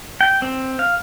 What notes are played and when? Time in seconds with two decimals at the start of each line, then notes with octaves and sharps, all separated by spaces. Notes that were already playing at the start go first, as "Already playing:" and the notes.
0.21 G5
0.42 C4
0.79 F5